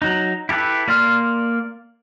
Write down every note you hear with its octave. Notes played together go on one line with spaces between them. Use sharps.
F#3 D#4
E4 G4 A4 B4 E5
A#3 D5 C6 F6